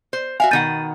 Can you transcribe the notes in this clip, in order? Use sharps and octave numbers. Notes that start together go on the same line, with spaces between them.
C5
F#4 E5 F5 G#5
B2 D#3 F#5 G6 A6 D#7